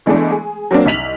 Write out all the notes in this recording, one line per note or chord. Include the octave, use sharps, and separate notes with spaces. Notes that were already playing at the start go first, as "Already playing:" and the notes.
E3 G#3 A3 B3 D4
G#4
F#3 A#3 C4 D4
C2 D#4 B6 F7 F#7